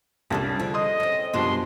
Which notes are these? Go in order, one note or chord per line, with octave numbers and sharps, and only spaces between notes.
C2 F2 G3 C#4 D4
D3 F3
D#5 C6 D#6
C4 C#4
F#2 B2 F3 G3 D4 C6